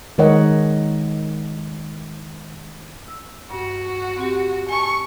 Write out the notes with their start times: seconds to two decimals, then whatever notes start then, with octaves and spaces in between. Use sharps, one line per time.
0.18 D#3 G#3 A#4 C#5 D#5 F#5
3.08 E6
3.50 G2 F#4
4.18 C4 G4
4.69 G#5 A5 C#6